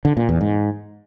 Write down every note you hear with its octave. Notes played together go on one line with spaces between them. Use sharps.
D3
A#2
E2
G#2